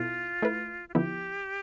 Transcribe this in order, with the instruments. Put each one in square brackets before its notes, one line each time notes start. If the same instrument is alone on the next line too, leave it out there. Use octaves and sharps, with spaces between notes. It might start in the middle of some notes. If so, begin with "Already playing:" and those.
Already playing: [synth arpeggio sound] B2 B3 E4 A4 [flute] F4
[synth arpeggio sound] A3 E4 B4
[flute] F4
[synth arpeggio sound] D3 F3 B3 E4 [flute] G4